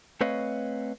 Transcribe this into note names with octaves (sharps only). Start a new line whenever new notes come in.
A3 C4 B4 C#5 D#5 F5